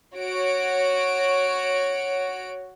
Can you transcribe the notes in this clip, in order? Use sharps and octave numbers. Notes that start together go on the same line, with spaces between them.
F#4 C#5 D7